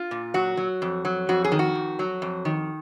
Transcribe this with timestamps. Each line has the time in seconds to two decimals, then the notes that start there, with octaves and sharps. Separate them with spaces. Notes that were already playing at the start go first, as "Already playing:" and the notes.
Already playing: F4
0.11 A#2
0.34 F#3 F#4
0.57 F#3
0.82 F2
1.05 F#3
1.29 F2 F#4
1.44 G#4
1.52 D#3
1.59 F#4
1.75 F2
1.99 F#3
2.22 F2
2.45 D#3